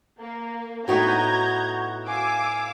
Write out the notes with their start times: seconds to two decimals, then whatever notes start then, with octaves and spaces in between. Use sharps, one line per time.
0.20 A#3
0.88 A2 B3 D#4 F#4 A#5 G6 G#6
2.07 F5 G#5 D6 E6